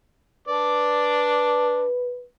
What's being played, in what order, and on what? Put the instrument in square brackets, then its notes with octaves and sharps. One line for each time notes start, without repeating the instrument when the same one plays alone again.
[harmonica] D4 D5 [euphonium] B4